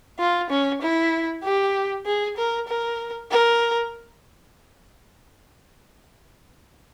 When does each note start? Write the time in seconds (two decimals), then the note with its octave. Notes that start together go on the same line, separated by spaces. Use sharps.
0.19 F4
0.50 C#4
0.82 E4
1.44 G4
2.06 G#4
2.37 A#4
2.68 A#4
3.31 A#4